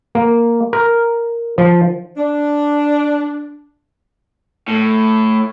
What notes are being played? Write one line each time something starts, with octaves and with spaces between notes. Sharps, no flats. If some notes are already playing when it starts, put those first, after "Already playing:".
A#3
A#4
F3
D4
A2